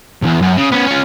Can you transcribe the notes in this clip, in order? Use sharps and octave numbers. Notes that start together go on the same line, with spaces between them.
B1 E2
F#2
C#3
B3 C#4
C#4 F4